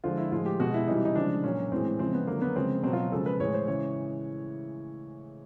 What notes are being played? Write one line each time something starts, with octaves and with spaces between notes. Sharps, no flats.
D3 F3 G#3 F4
E4
A2 F3 G#3 F4
G4
B2 G#3 F#4
E4
C3 E3 G3 D#4
E4
D#4
C#3 F3 G#3 D4
A#2 F#3 C#4
A2 E3 G#3 C4
C#3 F3 G#3 C4
B3
D3 F#3 A#3
B3
C#3 F3 G#3 C4
B2 F#3 C4
F4
C#3 F3 G#3 A4
B4
A2 E3 G#3 C#5
C5
C#3 E3 G#3 C#5